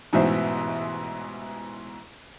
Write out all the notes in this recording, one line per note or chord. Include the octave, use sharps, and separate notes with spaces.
A1 G#2 B2 E3 C5 E5